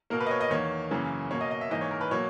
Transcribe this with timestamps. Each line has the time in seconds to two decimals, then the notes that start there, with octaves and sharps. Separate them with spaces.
0.10 B2 A#3 A#4
0.21 B4
0.26 D#5
0.31 C#5
0.41 D#5
0.50 E2 D#3 A#3 C#5
0.91 F#2 C#3 E3 A#3
1.31 B2 A#3 C#5
1.41 D#5
1.51 D#5
1.61 E5
1.71 G#2 E3 A#3 D#5
1.81 C#5
1.91 A#4
2.01 B4
2.11 B2 F#3 A#3 C#5